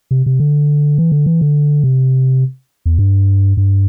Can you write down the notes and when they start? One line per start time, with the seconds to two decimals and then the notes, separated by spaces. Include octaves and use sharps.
0.11 C3
0.26 C3
0.40 D3
0.98 E3
1.12 D3
1.26 E3
1.41 D3
1.84 C3
2.86 E2
2.99 G2
3.57 G2